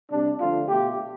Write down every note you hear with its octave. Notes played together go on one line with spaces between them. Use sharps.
C3 G3 D4
D3 F3 A3 F4
B2 A3 G4